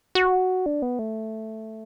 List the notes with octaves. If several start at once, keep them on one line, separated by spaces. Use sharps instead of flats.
F#4
D4
B3
A3